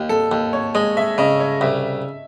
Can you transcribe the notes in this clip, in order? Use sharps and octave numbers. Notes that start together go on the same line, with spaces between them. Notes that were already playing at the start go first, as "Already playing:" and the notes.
Already playing: D#2
A4
D#2
C#5
G#3 D#5
E5
C#3 D#5
C#5
C2 E5